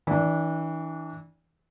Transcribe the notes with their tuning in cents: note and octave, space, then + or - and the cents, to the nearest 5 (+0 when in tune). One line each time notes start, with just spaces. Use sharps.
E3 -30 D4 -10